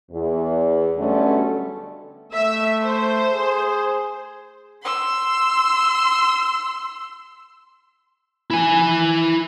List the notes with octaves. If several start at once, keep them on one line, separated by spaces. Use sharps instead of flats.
E2
B2 D3 F#3 G3 A3 C#4
A3 E5
C5
G#4
C6 E6
E4 G#5